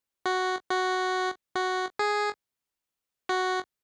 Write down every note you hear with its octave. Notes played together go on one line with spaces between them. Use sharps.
F#4
F#4
F#4
G#4
F#4